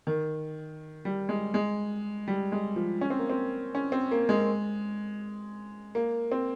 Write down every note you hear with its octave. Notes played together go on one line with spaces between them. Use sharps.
D#3
G3
G#3
G#3
G3
G#3
F3
C#4
C4
A#3
C4
C#4
C4
A#3
G#3
A#3
C4